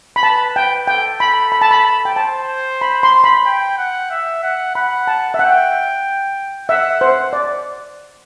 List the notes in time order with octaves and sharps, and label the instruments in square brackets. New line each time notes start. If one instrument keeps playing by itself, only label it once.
[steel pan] B5
[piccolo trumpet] B4 [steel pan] A5
[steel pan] G5
[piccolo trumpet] A4 [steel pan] G5
[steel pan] B5
B5
A5
B5
G5
[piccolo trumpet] C5 [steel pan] A5
[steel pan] B5
C6
B5
[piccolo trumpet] G5
F#5
E5
F#5
[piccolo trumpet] F#5 [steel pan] B5
[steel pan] A5
E5
[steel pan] F#5 [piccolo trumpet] G5
[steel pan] E5 [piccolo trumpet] F#5
[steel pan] C5 [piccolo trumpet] F#5
[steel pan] D5